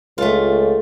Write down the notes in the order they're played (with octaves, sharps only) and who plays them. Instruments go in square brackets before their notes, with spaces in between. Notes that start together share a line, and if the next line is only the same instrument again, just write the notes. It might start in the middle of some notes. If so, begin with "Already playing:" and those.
[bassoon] C#2 [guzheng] A3 F4